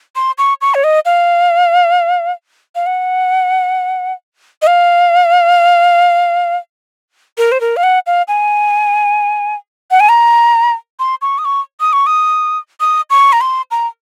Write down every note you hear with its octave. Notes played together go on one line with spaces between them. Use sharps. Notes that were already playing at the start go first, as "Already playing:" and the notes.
C6
C#6
C#6
C#5
D#5
F5
F5
F#5
D#5
F5
A#4
C5
A#4
F5
F#5
F5
G#5
F#5
G#5
A#5
C6
C#6
D#6
C#6
D#6
C#6
D#6
D#6
C#6
A#5
C6
A#5